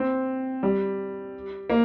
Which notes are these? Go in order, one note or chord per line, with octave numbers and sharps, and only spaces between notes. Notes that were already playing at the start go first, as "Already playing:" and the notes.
Already playing: C4
G3
A#3